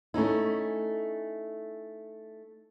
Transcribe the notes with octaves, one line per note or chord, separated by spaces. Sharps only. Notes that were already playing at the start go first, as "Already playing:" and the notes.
A3 C#4 D#4 E4